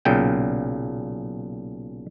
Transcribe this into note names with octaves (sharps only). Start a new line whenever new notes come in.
B1 A#2 C#3 G5